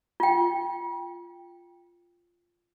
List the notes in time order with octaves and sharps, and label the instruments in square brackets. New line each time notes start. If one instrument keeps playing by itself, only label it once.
[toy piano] F4 G5